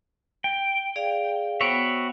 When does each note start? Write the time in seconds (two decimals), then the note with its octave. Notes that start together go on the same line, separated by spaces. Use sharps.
0.44 G5
0.96 G#4 D5 F5
1.61 B3 F#4 C5 C#5 E5 G5